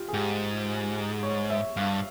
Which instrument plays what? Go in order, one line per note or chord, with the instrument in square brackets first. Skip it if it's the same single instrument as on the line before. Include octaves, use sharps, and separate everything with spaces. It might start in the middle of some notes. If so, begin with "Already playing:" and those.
Already playing: [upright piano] F4 G4
G#4
[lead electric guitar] G#2 [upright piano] G4
[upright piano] C#5
E5
[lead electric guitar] G2 [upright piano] F5